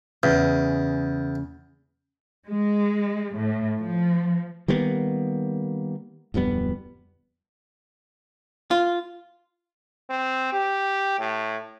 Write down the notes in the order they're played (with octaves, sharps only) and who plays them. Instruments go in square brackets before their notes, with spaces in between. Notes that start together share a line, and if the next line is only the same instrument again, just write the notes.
[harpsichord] E2 [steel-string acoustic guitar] C#3
[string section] G#3
A2
F3
[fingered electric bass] D#3 G3 A#3 B3
D1 F2 G3 B3
[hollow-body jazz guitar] F4
[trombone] C4
G4
A2